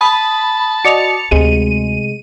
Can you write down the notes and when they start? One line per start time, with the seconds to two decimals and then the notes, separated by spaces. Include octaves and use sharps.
0.01 A5 B5 D#6
0.85 F#4 D5 D#5 C#7 F7
1.31 D2 C3 G#3 D#7